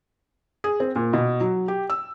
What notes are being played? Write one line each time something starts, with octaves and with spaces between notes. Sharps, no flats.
G#4
C4
A#2
B2
F#3
G4
E6